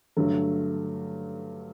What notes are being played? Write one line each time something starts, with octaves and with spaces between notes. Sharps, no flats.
G2 D3 F#3 A3